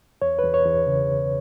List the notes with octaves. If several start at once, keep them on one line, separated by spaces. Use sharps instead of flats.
E2 C#5
E2 B4
C#5
E2
C#3
E2